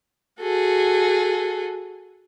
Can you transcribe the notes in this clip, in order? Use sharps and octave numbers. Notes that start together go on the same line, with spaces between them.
F#4 G#4 A4